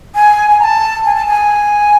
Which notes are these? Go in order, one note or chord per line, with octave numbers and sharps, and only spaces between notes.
G#5
G#5
A#5
A5
G#5
A5
G#5